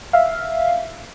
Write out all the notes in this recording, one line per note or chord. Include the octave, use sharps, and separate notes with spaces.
E5 F5